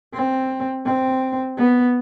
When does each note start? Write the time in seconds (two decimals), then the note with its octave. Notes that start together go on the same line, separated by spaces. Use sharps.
0.14 C4
0.85 C4
1.58 B3